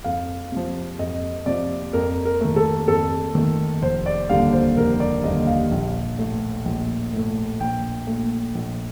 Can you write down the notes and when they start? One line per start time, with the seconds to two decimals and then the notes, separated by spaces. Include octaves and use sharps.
0.04 F2 F5
0.52 C3 F3
0.99 F2 D#5
1.46 C3 F3 D5
1.93 F2 A#4
2.25 A#4
2.41 D#3 A3
2.56 A4
2.88 F2 A4
3.35 D#3 A3
3.82 F1 C5
4.06 D5
4.29 D#2 D3 G3 F5
4.53 C5
4.77 F1 A#4
5.00 D5
5.24 D#2 D3 G3 D#5
5.47 F5
5.72 A#1
6.19 A2 A3
6.65 A#1
7.13 A2 A3
7.60 A#1 G5
8.07 A#2 A3
8.55 A#1